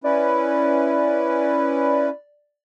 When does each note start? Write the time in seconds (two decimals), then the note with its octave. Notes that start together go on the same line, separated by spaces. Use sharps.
0.04 C#4 E4 B4 D5